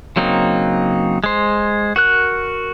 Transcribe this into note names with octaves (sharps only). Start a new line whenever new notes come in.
C#3 F#3 A#3 C4 D#4
G#3 C5
F#4 A#4 F#6